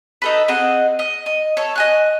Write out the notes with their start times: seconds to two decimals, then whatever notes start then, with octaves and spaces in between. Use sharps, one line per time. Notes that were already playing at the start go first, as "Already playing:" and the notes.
0.22 D#4 A4 B4
0.48 C4 G#4 D#5 F#5
0.99 D#5
1.26 D#5
1.57 A4 C#5
1.76 D#5 G#5 F#6